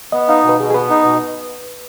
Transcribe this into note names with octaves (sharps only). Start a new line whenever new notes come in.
B3 D#5
D#4 F5
B2
B4
B2 G#4
G#4
B3 B4
D#4
B2